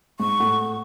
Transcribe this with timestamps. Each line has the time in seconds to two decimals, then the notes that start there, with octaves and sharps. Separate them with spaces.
0.20 G#2 C#6
0.40 A2 A3 F#5